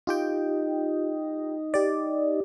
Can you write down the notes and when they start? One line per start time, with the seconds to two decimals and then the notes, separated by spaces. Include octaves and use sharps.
0.07 D#4 F4 G4 G5
1.74 G4 D5